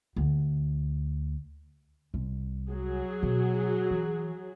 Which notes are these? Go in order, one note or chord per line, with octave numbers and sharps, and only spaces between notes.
D2
C2
F#3 G#4
B2
E3